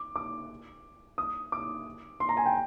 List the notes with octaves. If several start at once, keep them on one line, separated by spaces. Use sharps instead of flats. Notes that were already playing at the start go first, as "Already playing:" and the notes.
Already playing: D6
D6
D#6
D6
C6
A#5
G#5
G5